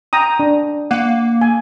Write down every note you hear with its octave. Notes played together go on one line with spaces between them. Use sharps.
G5 A#5 D#6
D4
A#3 F#5
G#5